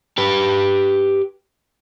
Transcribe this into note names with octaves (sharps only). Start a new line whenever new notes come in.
G4 B4